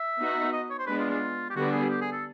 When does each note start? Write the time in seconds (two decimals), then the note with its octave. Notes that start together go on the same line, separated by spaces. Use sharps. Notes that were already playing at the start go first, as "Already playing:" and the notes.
Already playing: E5
0.19 B3 D#4 F#4
0.53 D#5
0.70 C#5
0.79 C5
0.87 G#3 B3 D4 B4
0.99 F4
1.10 F4
1.50 G4
1.56 D3 G3 B3 D4 F#4
1.72 G#4
1.90 G4
2.01 G#4
2.13 A4